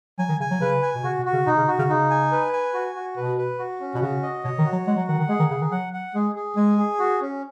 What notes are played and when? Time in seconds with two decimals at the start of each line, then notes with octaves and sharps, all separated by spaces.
0.19 F#3 G#5
0.29 D#3
0.40 C#3 G#5
0.51 F#3
0.61 C#3 B4
0.82 G#5
0.95 B2
1.04 C#3 F#4
1.19 B2
1.26 F#4
1.33 C#3
1.47 B2 D#4
1.57 C#3
1.68 F#4
1.79 C#3
1.89 C#3 D#4
2.10 G#5
2.32 B4
2.53 G#5
2.74 F#4
2.95 F#4
3.17 B2 B4
3.37 B4
3.59 F#4
3.80 C#4
3.95 B2
4.01 C#3 F#4
4.23 D#5
4.44 B2 C#5
4.59 D#3
4.65 F#4
4.73 F#3
4.87 G#3 F#5
4.97 F#3
5.08 D#3 F#5
5.18 D#3
5.29 G#3 G#4
5.39 D#3
5.50 C#3 G#4
5.61 D#3
5.72 F#3 F#5
5.93 F#5
6.15 G#3 G#4
6.36 G#4
6.57 G#3 G#5
6.78 G#4
6.99 F#4
7.21 C#4